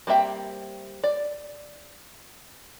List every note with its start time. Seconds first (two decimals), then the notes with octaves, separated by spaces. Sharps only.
0.07 G3 A#3 C4 E5 G5
1.04 D5